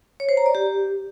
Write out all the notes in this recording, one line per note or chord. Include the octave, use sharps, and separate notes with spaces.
C#5
C5
A#5
D5
G4